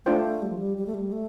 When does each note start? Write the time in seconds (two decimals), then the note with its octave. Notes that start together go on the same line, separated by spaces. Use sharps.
0.06 A3 D4 F4 C5 G5
0.42 G3
0.50 F3
0.57 G3
0.77 G3
0.86 A3
0.94 G3
1.12 A3